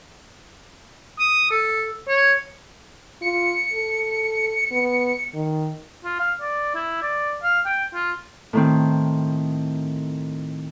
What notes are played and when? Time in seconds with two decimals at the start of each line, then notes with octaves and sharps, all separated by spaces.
1.19 D#6
1.51 A4
2.08 C#5
3.22 F4 C#7
3.72 A4
4.71 B3
5.34 D#3
6.04 F4
6.20 F5
6.41 D5
6.75 E4
7.02 D5
7.43 F5
7.66 G5
7.94 F4
8.53 A2 D#3 C4